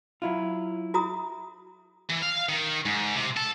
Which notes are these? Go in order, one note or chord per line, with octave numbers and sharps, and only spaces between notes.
F#3 E4 F4
F#4 A#5 D#6
E3
F5
D#3
G#2
C3
A4